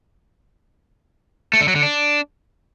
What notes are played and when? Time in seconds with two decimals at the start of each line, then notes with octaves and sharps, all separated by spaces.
1.53 A3
1.61 D3
1.68 F#3
1.75 D3
1.83 D4